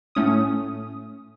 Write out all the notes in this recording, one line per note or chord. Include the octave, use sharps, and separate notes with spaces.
A2 A3 C#4 D#6